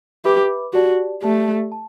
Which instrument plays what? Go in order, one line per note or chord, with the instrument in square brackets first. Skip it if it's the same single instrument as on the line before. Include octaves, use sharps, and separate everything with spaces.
[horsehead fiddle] G4 [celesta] B4 E5 B5 D6
[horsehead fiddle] F#4 [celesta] G4 D5 A5
[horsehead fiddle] A3 [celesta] G4 D5 A5
[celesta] A5